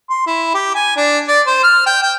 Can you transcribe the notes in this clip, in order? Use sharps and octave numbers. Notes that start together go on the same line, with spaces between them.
C6
E4
G4
G#5
D4
D5
C5
F6
G5
G5